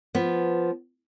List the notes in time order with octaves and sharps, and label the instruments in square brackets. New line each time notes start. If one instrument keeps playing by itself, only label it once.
[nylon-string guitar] F3 B3